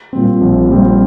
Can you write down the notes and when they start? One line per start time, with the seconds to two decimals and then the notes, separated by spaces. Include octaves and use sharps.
0.13 A#2 G3 C4
0.41 A#1
0.69 A#2 G3 C4